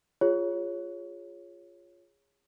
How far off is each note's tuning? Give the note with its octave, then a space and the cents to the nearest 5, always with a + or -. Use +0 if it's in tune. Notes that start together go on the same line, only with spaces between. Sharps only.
F4 +0 G#4 -20 C#5 +0